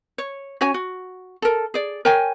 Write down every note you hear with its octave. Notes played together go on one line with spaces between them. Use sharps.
C#5
C#4 F#4 C#5 G#5
F#4
A4 A#4
G#4 D5
A#4 C#5 G5 G#5